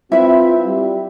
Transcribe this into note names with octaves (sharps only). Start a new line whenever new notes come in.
C4 E4 F4 B4 E5
G3